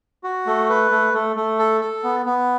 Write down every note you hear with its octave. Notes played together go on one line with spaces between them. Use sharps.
F#4
A3
B4
A3
A3
A3
A4
A4
B3
B3